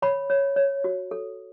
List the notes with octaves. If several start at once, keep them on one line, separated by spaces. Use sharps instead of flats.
C#5 B5
C#5
C#5
F#4
A4